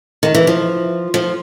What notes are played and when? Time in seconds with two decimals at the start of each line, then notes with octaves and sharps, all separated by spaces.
0.23 D#3
0.35 E3
0.47 F3
1.14 F3